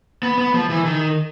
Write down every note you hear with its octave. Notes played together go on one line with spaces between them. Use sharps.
B3
B3
F3
E3
D#3